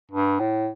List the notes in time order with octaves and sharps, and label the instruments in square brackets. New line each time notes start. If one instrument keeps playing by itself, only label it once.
[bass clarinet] G2
A2